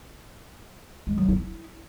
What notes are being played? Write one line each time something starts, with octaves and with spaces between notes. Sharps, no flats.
G#3
F#3
E4